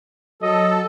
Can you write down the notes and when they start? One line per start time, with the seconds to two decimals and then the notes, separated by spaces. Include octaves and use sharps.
0.42 F#3 A4 D#5